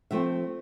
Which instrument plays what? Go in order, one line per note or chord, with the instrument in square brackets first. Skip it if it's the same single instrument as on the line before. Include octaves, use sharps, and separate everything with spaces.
[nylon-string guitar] D3 F3 A3 C4 E5